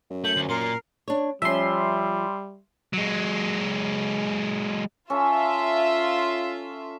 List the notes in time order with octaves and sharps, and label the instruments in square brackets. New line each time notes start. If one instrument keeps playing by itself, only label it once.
[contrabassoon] F#2
[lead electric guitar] A3 [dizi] G6 [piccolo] F#7
[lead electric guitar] D2
[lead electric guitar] A#2 [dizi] A#4 [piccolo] C6
[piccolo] C7
[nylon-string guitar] D4 C#5
[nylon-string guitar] F3 C#4 [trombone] G3 [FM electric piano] E5 C6
[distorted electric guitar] F#3 G#3
[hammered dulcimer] C#4 A4 [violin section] F4 E5